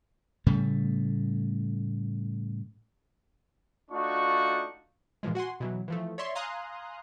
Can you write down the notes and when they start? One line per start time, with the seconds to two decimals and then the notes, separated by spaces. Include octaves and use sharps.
0.46 A2 C#3 G3 A3
3.91 A3 D4 D#4 F4 F#4 C#6
5.23 A#2 E3 F3 G#3
5.35 F#4 F#5 G#5 C6
5.60 B2 E3 F#3
5.88 E3 F3 A3
6.18 C#5 D5 E5 C6 C#6
6.35 F5 G#5 A#5 C6 D#6 F#6